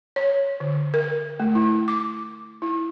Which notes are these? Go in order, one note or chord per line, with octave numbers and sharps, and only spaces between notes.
C#5
D3
A#4
A3
E4
D6
E4